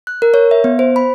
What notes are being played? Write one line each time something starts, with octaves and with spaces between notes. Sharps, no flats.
F#6
A#4
C#5
E5
B3
C5
B5